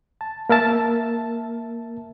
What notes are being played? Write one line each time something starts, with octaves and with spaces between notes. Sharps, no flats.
A5
A#3 A#4 E5 A5